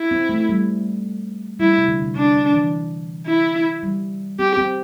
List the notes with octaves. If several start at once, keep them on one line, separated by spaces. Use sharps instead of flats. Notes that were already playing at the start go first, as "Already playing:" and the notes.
Already playing: E4
C4
A3
G3
G3 E4
C3
D3
C3
C3 D4
D3
E3
E4
G3
C4 G4
C4